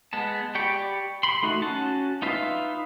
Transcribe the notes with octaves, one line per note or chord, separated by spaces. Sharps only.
G#3 B3 A5
G4 D5 G5 B5 C#6
B5 C6
A3 D#4 F#4
C#4 F#4 A5
D#4 F4 B4 E5 F5